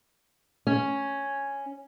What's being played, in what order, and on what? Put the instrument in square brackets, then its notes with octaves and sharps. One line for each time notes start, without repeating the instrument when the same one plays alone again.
[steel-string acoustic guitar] C#4